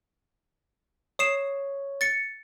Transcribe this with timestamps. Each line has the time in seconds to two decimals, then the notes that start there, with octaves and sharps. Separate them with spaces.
1.19 C#5 D#6 C7 E7
2.01 A6 C#7